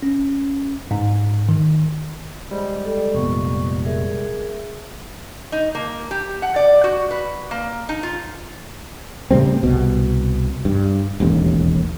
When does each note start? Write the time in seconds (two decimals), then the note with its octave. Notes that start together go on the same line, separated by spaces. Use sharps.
0.02 C#4
0.91 G#2
1.49 D#3
2.51 G3 G#3 C5
2.85 A4 D5 G5
3.15 F1 A#2 B3 C#6
3.85 G#4 A#4 E5
5.52 D#4
5.75 A#3
6.11 G4
6.42 F#5
6.56 D5
6.84 F#4
7.11 B4
7.51 A#3
7.89 D#4
8.03 F4
9.31 A2 C#3 G3 C4
9.63 C2 B2
10.65 G2
11.20 E1 A1 D#2